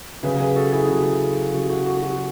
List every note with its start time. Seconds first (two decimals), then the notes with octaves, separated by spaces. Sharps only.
0.23 C#3 F#3 G#4 B4
0.40 G#4 B4
0.56 F#4 A4
0.72 E4 G#4
0.88 C#3 F#3 F#4
1.53 C#3 F#3 F#4
1.70 F#4
1.86 F#4
2.02 F#4